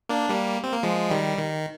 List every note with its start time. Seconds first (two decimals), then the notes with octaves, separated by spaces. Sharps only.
0.09 A#3 D4
0.29 G3 A#3
0.64 C4
0.73 A#3
0.83 F3 G#3
1.10 D#3 G3
1.38 D#3